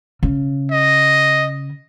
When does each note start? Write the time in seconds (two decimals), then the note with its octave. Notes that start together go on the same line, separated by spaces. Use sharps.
0.23 C#3
0.71 D#5